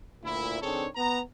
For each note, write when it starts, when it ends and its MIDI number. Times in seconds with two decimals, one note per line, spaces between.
0.24 0.59 38
0.24 0.59 46
0.24 0.59 64
0.62 0.87 51
0.62 0.87 60
0.62 0.87 62
0.62 0.87 68
0.62 0.87 69
0.62 0.87 73
0.96 1.20 59
0.96 1.20 82